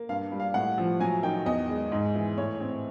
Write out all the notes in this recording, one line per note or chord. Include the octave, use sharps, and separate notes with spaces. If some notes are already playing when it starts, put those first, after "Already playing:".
Already playing: A#3
G2 F5
G3
F5
A2 F#5
F3
F#3 G#5
D#3 G5
E2 D#5
G#3
G#2
E3
A2 C#5
C4